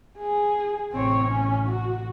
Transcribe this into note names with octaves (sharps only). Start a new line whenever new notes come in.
G#4
A1 C3 C4 C#5
C#4
F#4